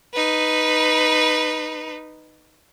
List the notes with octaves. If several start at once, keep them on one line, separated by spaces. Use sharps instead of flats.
D#4 B4